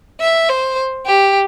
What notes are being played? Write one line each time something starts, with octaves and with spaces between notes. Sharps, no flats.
E5
C5
G4